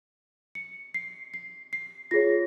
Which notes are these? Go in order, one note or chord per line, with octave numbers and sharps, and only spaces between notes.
C#7
C7
C7
C7
F4 G#4 C#5 A#6